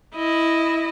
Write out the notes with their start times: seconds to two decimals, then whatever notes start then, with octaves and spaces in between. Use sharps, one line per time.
0.15 E4 D#5